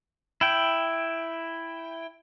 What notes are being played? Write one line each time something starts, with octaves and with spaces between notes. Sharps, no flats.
E4 G5